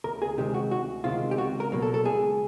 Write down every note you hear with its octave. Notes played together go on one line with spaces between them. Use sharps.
D2 A#4
G#4
C3 D#3 G#3 C4 G4
F#4
D2 F#4
C3 D#3 G#3 C4 F4
G4
C#2 F#4
A#4
B2 F#3 A#3
A4
A4
C#2 G#4